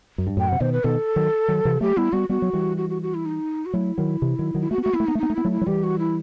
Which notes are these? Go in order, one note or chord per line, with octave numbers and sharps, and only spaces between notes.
F#2
G2
F#2 A2 G5
C3 F#5
B2 D#3 C5
B4
B2 D#3 A4
D#3 F#3
D#3 F#3
C3 E3
F#3 A3 G4
G3 B3 E4
G3 B3 F#4
G3 B3 F#4
F#3
E3 G3
F#4
F#4
F#4
E4
D#4
F#4
F#3 A3 E4
D#3 F#3
C3 E3
D#3 F#3
D#3 F#3
E4
A3 F#4
B3
A3 F#4
B3 E4
A3
B3 D#4
A3
B3 D#4
A3
B3 E4
F#3 A3
E4
F#3
E3 G3 G4
F#4
E4